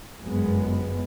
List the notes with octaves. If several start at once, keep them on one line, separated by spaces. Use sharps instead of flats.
G1 F#2 G#3 B3